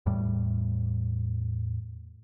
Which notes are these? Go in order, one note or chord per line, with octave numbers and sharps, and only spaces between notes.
E2 A2 G3